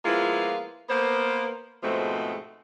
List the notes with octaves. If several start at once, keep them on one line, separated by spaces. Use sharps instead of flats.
F3 G#3 A#3 B3 E4 F4
A#3 B3 C5
G#2 B2 F3 G#3 A3 C4